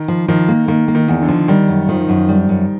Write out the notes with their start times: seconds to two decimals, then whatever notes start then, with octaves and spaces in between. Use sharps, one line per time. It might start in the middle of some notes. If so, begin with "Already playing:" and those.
Already playing: D#3
0.08 F3
0.28 D#3 F3
0.49 A#3
0.68 D#3 A#3
0.88 A#3
0.95 D#3
1.08 E2
1.22 D3
1.28 F3
1.48 D#3 G3
1.68 F#2
1.88 D#3 F3
2.09 F#2
2.29 G3
2.49 F#2